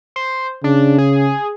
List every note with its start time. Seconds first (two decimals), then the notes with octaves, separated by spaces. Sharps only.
0.16 C5
0.64 C#3 D4
0.98 G#4